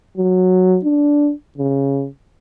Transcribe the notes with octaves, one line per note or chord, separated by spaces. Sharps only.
F#3
D4
C#3